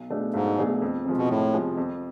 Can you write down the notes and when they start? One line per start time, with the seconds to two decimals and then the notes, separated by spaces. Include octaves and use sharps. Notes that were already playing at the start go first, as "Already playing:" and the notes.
Already playing: B1
0.10 B2 A3 D4 G#4
0.33 B1 G#2
0.58 B2 A3 D4 G#4
0.82 F2
1.05 C3 F3 G#3
1.17 B2
1.29 F2 A2
1.53 C3 F3 G#3
1.77 F2